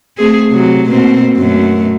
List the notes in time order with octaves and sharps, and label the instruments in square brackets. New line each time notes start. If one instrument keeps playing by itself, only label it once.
[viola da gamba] A3 C4 G#4
C3 F#3
B2 A#3 C4
F#2 B2 A3